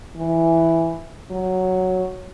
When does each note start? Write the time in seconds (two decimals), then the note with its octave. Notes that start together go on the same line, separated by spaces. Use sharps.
0.16 E3
1.31 F#3